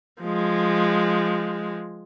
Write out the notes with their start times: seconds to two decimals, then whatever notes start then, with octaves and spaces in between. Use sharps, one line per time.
0.21 F3 G#3